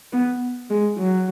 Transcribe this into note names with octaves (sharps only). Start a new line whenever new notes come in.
B3
G#3
F#3